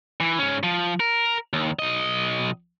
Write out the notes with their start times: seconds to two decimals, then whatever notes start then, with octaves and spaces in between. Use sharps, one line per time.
0.20 E3
0.38 G#2 C#4
0.63 F3
1.00 A#4
1.53 D#2
1.79 B1 D#5